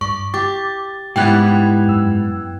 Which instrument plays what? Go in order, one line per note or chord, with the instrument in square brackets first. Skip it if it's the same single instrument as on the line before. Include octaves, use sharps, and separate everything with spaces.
[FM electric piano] G2 [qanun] D5 [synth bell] C#6
[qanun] G4 [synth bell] D6 [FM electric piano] A6
[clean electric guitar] G#2 G3 [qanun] B3 E4 G4 [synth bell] G5 F#6 G#6
[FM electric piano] F#2 E6